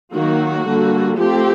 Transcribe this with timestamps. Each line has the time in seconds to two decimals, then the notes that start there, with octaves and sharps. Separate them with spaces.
0.14 D#3 F#3 A#3 F#4
0.67 D3 G3 A#3
1.18 F3 A3 C4 G4